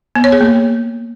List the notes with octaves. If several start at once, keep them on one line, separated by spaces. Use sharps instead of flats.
B3
C#5
G#4
A#3